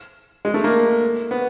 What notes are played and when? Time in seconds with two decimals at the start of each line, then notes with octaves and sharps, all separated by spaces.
0.45 G#3
0.54 A3
0.64 A#3
1.31 B3